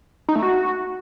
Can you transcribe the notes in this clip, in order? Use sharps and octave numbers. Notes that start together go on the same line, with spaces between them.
D#4
A3
F#4